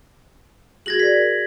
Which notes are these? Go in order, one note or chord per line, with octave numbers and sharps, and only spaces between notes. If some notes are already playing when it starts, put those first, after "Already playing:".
F#4 G#4 G#6 A#6 F#7
A#4 D5 B6